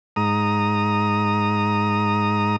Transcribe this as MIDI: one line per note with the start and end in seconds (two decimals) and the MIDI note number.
0.16 2.56 44
0.16 2.56 82
0.16 2.56 87